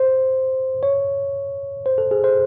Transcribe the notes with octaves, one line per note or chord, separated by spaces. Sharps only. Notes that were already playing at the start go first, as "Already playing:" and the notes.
Already playing: C5
C#5
C5
A4
G#4
C5